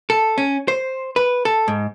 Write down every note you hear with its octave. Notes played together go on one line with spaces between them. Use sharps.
A4
C#4
C5
B4
A4
G#2